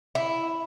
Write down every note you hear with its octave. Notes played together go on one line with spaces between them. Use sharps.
E4